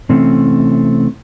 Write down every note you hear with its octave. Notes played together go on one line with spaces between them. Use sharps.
C3 E3 A3 C4 C#4